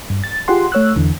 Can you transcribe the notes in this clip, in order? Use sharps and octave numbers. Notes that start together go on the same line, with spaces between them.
G2
A6
F4 G4 G#4 F#5 C6
A3 C#5 E6 F#6
E2 D3 E3